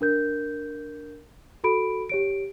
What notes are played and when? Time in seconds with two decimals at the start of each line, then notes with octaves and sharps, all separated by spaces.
0.01 D4 A#4 G6
1.64 F#4 A4 B5 D7
2.09 G4 C#5 D7